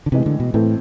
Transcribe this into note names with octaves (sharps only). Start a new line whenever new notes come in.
D3
A2 C3 E3 G#3
D3
B2
A2 E3 A3 C4